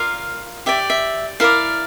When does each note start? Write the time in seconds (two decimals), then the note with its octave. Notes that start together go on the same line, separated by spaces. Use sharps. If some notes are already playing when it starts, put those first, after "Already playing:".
Already playing: F4 A#4 D5 F5
0.66 G4 D5 E5
0.90 E5
1.40 E4 A#4 D5 F5